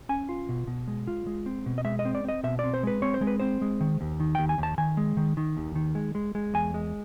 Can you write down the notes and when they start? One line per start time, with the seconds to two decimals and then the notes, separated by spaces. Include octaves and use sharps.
0.09 C#4 G#5
0.29 F4
0.49 B2
0.67 B2
0.88 G#3
1.07 F4
1.27 G#3
1.46 C4
1.66 B2
1.78 D#5
1.85 G#3 E5
1.99 D#5
2.05 C4
2.15 D5
2.24 C4 D#5
2.44 B2 E5
2.59 C4 D5
2.74 C5
2.83 G#3 B4
3.02 C4 C#5
3.14 C5
3.21 G#3
3.27 B4
3.40 C4 C5
3.62 G#3
3.81 D#3
4.01 D#2
4.20 D#3
4.35 D#2 G5
4.49 G#5
4.58 D#2 A5
4.78 D#3 G#5
4.97 G#3
5.17 D#3
5.37 D#3
5.57 D#2
5.75 D#3
5.95 G#3
6.15 G#3
6.35 G#3
6.54 E2 G#5
6.74 G#3